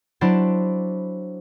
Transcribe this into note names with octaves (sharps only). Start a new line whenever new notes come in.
F#3 D4 E4 C5 D5